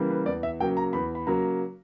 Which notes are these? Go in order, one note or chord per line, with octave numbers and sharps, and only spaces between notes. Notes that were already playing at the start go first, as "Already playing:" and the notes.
Already playing: C#3 E3 G3 A#3
B4
E2 D5
E5
C#3 F#3 A#3 G5
A#5
E2 B5
B5
C#3 F#3 A#3 A#5